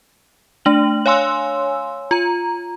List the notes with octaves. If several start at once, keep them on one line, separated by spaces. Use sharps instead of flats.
A3 D4 F#7
C#5 F5 G#5 C6 E6
F4 A#5